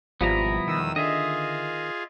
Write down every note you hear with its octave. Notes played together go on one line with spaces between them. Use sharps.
G#1 B2 F3 G3 B3 E4 A#5
E2 D#3 D#6 E6
D3 F4 G#4 D#5 E5